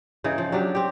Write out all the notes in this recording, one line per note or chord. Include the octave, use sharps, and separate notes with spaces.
C#3 E3 D#4
F3
F#3 D4 G4
C4 G4